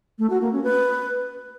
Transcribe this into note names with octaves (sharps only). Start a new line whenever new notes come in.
A3
F#4
A#3
C#4
B4